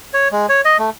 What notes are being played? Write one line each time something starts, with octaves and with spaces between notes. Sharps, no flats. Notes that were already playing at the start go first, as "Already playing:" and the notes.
C#5
G#3
C#5
D#5
A3